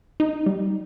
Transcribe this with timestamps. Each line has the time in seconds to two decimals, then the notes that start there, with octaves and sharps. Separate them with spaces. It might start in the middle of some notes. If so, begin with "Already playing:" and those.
0.20 D#4
0.46 G3